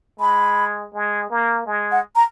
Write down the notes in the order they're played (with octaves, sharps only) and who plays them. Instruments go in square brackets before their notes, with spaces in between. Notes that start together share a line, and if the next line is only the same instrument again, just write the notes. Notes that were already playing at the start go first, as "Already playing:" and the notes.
[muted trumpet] G#3 [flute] B5
[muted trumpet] G#3
A#3
G#3
[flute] F#5
A#5